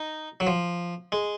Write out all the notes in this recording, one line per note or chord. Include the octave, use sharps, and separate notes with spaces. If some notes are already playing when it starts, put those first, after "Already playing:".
Already playing: D#4
F#3
F3
G#3